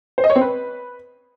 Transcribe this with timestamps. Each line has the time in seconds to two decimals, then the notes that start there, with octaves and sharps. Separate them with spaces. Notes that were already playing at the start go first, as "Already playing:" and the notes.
0.18 C5
0.24 D#5
0.30 C#5
0.36 C4
0.41 B4